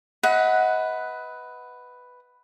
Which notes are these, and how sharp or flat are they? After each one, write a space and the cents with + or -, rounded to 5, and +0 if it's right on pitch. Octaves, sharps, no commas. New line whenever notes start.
B4 +5 D#5 +35 F#5 +0